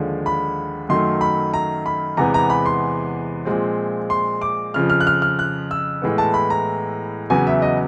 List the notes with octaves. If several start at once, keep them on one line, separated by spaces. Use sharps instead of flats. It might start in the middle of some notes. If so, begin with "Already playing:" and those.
Already playing: D#2 D3 F3 G#3
B5
F#2 D#3 F#3 A3 C6
B5
A#5
B5
E2 C3 E3 G#3 B3 A#5
A#5
B5
C6
A#2 F3 G#3 C4
C6
D6
F2 C#3 F3 F6
F6
F#6
F6
F6
F#6
E6
A2 E3 G#3 B3
A5
B5
A#5
E2 C#3 F#3 B3 G#5
E5
D#5